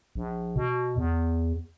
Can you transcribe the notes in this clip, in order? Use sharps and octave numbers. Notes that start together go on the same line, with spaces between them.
A#1
B2
E2